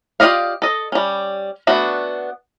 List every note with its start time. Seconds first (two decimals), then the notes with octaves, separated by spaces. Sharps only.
0.20 F4 G4 D5 D#5 F5
0.62 A4 D#5
0.92 G3 C#4
1.67 A3 B3 D4 F#4